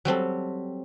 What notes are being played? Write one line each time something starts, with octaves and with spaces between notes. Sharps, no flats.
F#3 G3 C4 A4